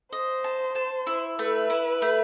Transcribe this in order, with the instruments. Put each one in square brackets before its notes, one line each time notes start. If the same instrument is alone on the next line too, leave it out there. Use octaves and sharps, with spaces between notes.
[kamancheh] C5 [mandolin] D#5
[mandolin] A5
A5
E4
[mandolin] A3 [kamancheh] B4
[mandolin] E4
A3